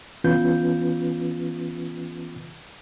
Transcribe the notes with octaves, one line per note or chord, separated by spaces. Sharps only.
E3 B3 C#4 F4 B4 G6